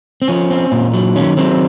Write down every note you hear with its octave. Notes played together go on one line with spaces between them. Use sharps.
C4
F3 C#4
C4
A#2
F#3
D#3 C#4
F#3 C4